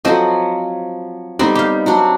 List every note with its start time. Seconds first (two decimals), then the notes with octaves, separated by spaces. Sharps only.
0.05 F3 F#3 C4 C5 D#5
1.39 G3 B3 C4 D#4
1.55 G4 F5
1.86 F#3 C4 D4